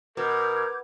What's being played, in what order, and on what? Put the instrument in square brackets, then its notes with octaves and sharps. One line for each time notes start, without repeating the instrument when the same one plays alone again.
[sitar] B2 [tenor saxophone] A#4 [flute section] D6 G6 G#6